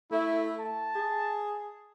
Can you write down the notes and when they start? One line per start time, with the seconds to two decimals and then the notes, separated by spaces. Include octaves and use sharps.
0.11 A3 E4
0.60 A5
0.95 G#4